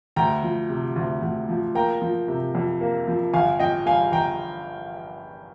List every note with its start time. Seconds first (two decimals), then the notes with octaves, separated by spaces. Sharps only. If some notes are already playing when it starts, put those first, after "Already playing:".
0.16 D2 G5 A#5
0.43 F3
0.69 C3
0.96 D2
1.22 D2
1.49 F3
1.75 A#3 G5 A#5
2.02 F3
2.28 C3
2.55 F2
2.81 A#3
3.08 F3
3.34 G1 F5 G#5
3.59 F3 D#5 G5
3.86 G2 F5 G#5
4.12 G1 G5 A#5